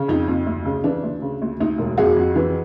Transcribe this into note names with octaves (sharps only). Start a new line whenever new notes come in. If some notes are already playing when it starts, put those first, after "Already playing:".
Already playing: C#3
F2 D#4
F2
D2
C#3
E3 D4
D2
C#3
D2
D2 D#4
E1
F2 F#4 G#4
F2
E3